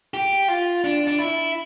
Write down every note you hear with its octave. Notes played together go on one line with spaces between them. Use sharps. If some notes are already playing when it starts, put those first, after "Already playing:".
G4
F4
D4
D4
E4